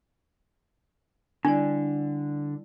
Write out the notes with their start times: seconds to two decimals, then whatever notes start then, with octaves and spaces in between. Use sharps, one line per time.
1.45 D3 G3 D4 E4 D5